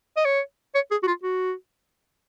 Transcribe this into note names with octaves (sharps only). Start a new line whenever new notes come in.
D#5
C#5
C#5
G#4
F#4
F4
F#4